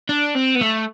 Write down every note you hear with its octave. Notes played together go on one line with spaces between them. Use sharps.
D4
C4
B3
A3